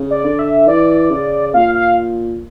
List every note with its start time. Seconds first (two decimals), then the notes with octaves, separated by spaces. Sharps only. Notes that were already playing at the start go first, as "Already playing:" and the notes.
Already playing: C#3
0.11 D5
0.25 D3
0.39 E5
0.67 E3 D5
1.11 C#3
1.54 A#2 F5
1.75 F5